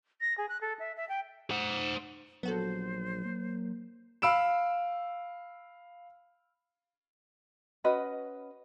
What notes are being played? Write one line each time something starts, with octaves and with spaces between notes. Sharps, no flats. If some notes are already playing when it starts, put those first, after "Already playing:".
A#6
G#4
F#6
A4
E5
E5
G5
C5 F#5
A#1 F#3 B3 F#4 A4 C5
A#3
F5 B5 E6 D7 E7
C#4 F#4 B4 D#5